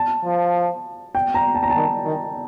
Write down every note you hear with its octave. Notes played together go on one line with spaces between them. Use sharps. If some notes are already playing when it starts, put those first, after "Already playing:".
Already playing: A5
F3
G5
A#5
A5
A#5
A5
D#3
D#3